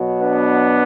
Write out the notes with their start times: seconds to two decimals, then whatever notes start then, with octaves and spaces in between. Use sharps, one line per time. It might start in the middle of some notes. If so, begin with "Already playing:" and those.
Already playing: B2 F#3
0.20 B3 D4